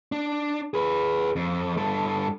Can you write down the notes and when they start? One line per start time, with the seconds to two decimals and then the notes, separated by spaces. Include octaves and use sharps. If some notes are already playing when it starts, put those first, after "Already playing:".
0.12 D4
0.74 G#4 B4
1.36 F2
1.77 G2 A4